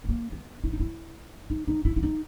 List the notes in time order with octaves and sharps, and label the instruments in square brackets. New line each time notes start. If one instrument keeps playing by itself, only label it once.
[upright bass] B3
A#3
B3
E4
D#4
E4
D#4
D#4
E4
E4
D#4